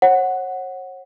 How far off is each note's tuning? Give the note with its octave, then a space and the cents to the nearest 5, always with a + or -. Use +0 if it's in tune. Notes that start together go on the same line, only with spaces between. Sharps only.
C#5 -40 F#5 +0